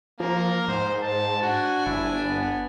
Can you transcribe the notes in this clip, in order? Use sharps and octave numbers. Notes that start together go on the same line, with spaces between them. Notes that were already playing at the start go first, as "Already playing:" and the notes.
F3 A#3 A#4
G#2 C5
C5 A5
D4 F#4 G#5
G1 E4
B3